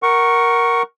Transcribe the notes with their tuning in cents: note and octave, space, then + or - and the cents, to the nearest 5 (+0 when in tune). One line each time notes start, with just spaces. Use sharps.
A#4 +5 F#5 +20 C#6 -5